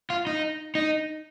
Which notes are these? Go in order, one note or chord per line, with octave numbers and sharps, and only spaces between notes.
F4
D#4
D#4